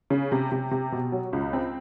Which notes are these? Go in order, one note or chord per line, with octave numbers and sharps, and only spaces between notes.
C#3
C3
C3
C3
B2
F#3
C#2
C4